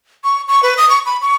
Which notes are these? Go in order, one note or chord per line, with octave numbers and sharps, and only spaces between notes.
C#6
C#6
B4
D#6
C#6
B5
C#6